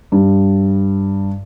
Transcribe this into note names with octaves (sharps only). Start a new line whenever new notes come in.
G2